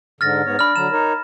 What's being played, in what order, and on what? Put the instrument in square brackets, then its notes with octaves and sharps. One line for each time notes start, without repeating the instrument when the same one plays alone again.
[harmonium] G#2 D3 [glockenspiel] F6 A6 A#6
[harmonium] G#2 B3 C#5
[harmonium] D4 D5 [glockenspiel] B5 F6
[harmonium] D3 F#3 A#5 [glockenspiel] E7
[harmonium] D#4 A#4 C#5